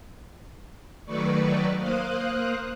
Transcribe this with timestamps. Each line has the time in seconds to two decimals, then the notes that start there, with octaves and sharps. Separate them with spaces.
1.05 D#3 F#3 A3 B4 D5 C#6
1.78 A#3 C5 F5 D#6 F#6